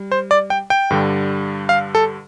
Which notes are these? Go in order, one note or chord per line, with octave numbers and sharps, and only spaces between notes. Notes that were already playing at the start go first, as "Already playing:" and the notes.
Already playing: G3
C5
D5
G5
G5
G2 D3 G3
F5
A4